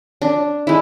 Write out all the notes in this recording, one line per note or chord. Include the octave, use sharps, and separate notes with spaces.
D4
G#3 E4